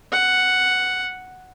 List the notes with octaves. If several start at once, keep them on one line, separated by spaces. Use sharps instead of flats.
F#5